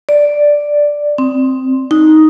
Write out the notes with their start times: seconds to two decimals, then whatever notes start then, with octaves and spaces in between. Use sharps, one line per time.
0.09 D5
1.18 C4
1.91 D#4